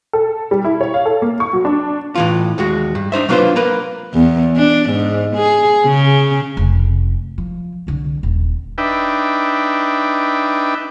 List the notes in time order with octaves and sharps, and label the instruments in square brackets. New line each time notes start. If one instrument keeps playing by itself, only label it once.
[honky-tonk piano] A4
G3
E4
C#5
F5
A4
A#3
C#6
F#3
D4
[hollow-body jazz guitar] A2 E3 F4
D#2 G#3 F#4
G2
D4 D#4 C5 E5
F#3 A#3 D4 F4 B4 C5
A#3 A#4 B4
[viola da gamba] E2
D4
G#2
G#4
C#3
[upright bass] F1
F3
C2 D3
D#1
[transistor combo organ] D4 D#4 B4 E5 G5